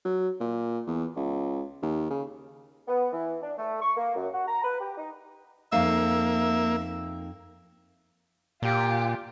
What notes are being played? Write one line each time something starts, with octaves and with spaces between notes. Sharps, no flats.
F#3
A#2
E2
C#2
D#2
C#3
B3
E3
D4
A3
C#6
A#3
F#2
F#4
A#5
B4
G4
D#4
F2 A#3 D#4 E5 F5
A#2 F4 G4